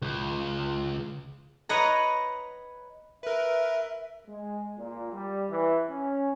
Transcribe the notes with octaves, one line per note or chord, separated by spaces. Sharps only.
C#2
B4 C#5 D#5 F#5 A#5
A#4 B4 E5
G#3
A#2
G3
E3
C#4